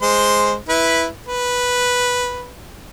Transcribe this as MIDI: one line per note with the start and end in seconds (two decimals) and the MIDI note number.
0.02 0.55 56
0.02 0.55 72
0.02 0.55 84
0.69 1.07 64
0.69 1.07 71
1.27 2.53 71